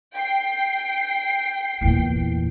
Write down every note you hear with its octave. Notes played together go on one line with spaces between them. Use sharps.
G5 C7
E2 A#2